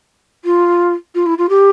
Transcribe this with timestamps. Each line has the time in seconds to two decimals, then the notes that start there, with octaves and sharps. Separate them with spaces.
0.44 F4
1.14 F4
1.26 E4
1.38 F4
1.49 G4